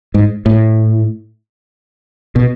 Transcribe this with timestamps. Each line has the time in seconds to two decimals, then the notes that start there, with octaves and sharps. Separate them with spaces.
0.14 G#2
0.46 A2
2.36 B2